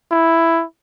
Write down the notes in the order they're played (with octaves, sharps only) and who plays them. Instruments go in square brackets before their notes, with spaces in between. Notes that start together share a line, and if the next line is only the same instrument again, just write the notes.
[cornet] E4